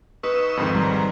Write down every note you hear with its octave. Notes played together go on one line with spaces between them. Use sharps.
D#4 B4 C#6 E6
F2 G#2 D#3
G3 A#4